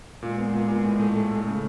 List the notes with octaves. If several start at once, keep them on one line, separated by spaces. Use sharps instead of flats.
A#2 G#3
B3
A#2
A#2
A2
A3
A3
A3
C#3